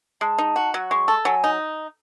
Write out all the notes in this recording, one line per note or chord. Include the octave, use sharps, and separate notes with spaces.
G#3 A5
D#4
F#4
F#3
G#3 C#6
A4
F#3 G#5
D#4